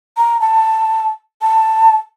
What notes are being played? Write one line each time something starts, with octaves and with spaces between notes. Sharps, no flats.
A#5
A5
A5